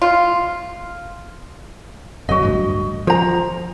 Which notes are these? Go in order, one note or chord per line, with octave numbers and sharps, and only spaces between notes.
F4
F#1 F#3 F#4 D#5
D1 A1 G2
F3 C5 A#5